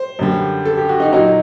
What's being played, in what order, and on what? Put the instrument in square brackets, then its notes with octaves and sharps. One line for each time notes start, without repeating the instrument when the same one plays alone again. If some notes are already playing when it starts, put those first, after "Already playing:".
Already playing: [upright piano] C5
F#2 D3 G3
A4
G4
F#4
D#4
A#2 F#3 D#4